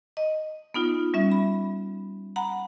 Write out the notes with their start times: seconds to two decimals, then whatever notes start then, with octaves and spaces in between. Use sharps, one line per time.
0.17 D#5
0.74 B3 D#4 F4
1.14 G3 C#4 E5
1.32 B5
2.36 F#5 A#5 B5